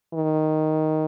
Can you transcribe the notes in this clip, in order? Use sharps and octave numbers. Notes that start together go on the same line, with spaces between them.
D#3